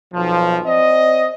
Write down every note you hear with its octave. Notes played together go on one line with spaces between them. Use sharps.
B1 F3
C4 D5 D#5